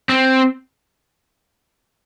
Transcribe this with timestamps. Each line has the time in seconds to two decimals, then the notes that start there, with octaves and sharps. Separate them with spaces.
0.09 C4